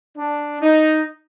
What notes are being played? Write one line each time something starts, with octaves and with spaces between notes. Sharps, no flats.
D4
D#4